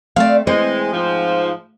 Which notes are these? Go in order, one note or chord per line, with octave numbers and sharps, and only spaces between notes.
A3 C4 D5 F5
E3 G#3 C4 C5
G#2 F3